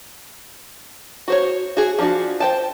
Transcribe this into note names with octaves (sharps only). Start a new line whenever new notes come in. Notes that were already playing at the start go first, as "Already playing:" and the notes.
F#4 C5 C#5
F#4 G#4
F3 D4 F#4
C5 G5 A5